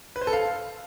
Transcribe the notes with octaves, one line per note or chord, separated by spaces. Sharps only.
B4
C5
A4
F5